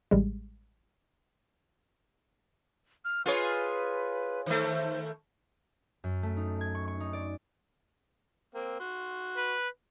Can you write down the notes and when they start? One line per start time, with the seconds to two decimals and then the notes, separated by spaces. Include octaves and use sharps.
0.11 A1 G3 G#3
3.05 F6
3.26 F4 G#4 B4 C#5
4.46 D#3 A3 C5
6.04 F#2
6.23 A3
6.37 D#4
6.61 G#6
6.75 C#6
6.88 C#6
7.00 D#4
7.13 D5
8.55 A#3 C4
8.80 F#4 C6
9.37 B4